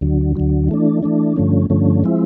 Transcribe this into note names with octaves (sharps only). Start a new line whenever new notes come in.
D2 D3 F#3
D2 D3 F#3
E3 A3 D4
E3 A3 D4
G2 D3 F3 A3 C#4
G2 D3 F3 A3 C#4
F3 G#3 C4 E4